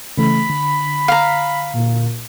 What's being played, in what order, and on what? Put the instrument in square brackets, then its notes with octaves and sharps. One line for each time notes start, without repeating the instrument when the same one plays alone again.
[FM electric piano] C#3 E3 A3 [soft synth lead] B5
[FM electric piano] D3
[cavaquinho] F5 A#5
[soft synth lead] A#2